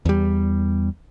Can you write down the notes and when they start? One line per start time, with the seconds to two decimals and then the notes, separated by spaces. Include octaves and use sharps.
0.05 E2 G3